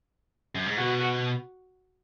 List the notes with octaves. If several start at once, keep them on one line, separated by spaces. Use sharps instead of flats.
F#2
G#2
B2 F#4